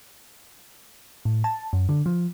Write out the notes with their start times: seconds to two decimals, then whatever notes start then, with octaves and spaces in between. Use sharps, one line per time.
1.25 A2
1.44 A5
1.73 F#2
1.89 D3
2.06 F3